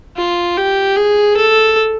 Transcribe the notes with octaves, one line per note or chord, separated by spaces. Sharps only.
F4
G4
G#4
A4